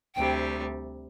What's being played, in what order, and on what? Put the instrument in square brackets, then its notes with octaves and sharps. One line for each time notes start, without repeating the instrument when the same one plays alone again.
[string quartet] D2 C3 G3 [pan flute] G5